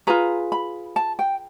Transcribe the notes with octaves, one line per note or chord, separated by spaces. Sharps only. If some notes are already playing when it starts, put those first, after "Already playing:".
F4 G#4 B4 A#5
B5
A5
G5